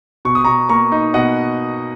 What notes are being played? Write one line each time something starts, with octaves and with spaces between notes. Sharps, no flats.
B2 C#6
D#6
B2 A#5 C#6
A#3 A#5 C#6
D#4
B2 D#5 F#5